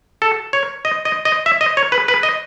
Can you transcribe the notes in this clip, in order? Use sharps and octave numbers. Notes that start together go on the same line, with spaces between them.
A4
C#5
D#5
D#5
D#5
E5
D#5
C#5
B4
B4
D#5